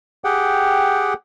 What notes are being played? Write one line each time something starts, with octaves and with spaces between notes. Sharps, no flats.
G4 G#4 F#5 G5